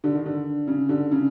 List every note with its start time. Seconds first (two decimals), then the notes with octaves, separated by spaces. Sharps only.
0.04 D3
0.15 D#3
0.26 D3
0.67 C#3
0.89 D3
1.11 C#3